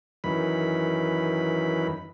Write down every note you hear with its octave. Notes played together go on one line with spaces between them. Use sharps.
F#2 D#3 E3 B5